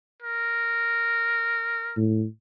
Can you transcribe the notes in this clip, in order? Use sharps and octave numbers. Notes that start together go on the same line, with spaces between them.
A#4
A2